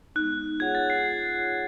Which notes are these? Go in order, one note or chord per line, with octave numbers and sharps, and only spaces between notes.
G#3 B3 D#4 F#6
F4 G#4 C#5 F#5 G#6
A6
C7